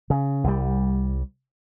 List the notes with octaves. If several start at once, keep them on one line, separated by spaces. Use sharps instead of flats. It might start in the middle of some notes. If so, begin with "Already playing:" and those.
C#3
C2 G3